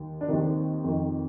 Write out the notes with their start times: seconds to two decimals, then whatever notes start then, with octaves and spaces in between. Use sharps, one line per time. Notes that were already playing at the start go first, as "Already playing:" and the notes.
Already playing: D#2
0.21 D4
0.28 D#2 D#3 C4
0.84 F2 D#3